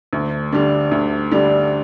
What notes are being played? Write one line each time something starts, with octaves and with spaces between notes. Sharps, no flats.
D2
D3 G3 D4
D2
D3 G3 D4